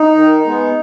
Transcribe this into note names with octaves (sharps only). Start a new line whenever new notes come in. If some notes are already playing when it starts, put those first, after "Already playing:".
Already playing: D#4
D#3
G#3 B3